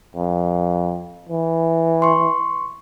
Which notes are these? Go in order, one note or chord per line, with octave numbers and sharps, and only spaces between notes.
F2
E3
C6 C#6